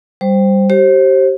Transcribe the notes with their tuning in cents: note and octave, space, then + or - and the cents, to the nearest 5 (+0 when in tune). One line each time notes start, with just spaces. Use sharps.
G3 +0 C5 +0
G4 -30 C5 +30